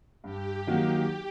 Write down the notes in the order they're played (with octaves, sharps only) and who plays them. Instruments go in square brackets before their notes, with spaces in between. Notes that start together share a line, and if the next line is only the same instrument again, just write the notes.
[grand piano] G2 [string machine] G4
[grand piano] D#3 F#3 A#3 F#4